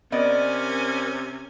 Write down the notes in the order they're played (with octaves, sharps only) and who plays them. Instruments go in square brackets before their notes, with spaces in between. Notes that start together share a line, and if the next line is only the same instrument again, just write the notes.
[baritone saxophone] C3 [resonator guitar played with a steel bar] B3 D5 D#5 [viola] C#4 G#5 [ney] A#4